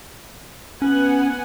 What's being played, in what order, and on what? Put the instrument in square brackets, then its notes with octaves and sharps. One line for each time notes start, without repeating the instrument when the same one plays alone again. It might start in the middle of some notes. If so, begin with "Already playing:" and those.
[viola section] B3 F#5 G#5 [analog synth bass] C#4